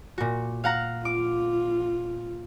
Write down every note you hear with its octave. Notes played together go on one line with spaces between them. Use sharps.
A#2 F#4
F5 F#5 A#5
F4 D6